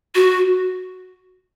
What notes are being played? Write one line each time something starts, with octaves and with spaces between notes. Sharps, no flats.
F#4